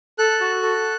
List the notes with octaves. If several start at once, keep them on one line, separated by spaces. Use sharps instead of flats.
A4 F#6
F#4
A4